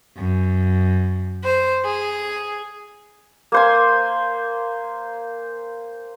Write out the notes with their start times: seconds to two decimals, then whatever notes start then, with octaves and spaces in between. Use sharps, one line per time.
0.18 F#2
1.42 C5
1.84 G#4
3.52 A#3 C5 G#5